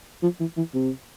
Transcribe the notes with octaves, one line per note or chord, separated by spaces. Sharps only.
F3
E3
E3
C3